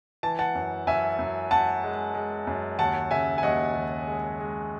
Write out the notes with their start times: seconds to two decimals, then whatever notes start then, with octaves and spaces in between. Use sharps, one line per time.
0.23 E3 A5
0.39 F#5 A5
0.55 F#2
0.87 F#2 E5 G#5
1.19 F#2
1.51 F#2 F#5 A5
1.84 G#3
2.15 G#3
2.47 F#2
2.79 D#2 F#5 A5
3.11 C#3 E5 G#5
3.38 G#5
3.43 D#2 D#5 F#5
3.75 D#2
4.07 G#3
4.39 G#3